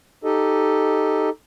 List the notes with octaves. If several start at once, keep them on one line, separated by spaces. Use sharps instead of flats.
D#4 G4 A4 D#5